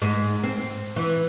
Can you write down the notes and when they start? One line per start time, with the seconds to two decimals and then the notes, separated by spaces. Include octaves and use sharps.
0.02 G#2
0.43 C4
0.96 E3